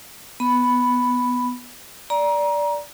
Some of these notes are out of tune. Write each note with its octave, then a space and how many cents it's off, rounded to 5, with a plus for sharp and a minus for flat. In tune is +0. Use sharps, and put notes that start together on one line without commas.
B3 +0 B5 +0
D5 -10 A#5 +25